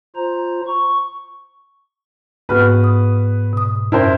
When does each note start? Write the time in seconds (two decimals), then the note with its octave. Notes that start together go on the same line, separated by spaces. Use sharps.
0.16 F4 C5 A#5
0.67 C#6
2.49 G#2 B3 F#4 B4 F6
2.84 D#6
3.53 B2 D#6
3.92 F#2 C#4 E4 A#4 C5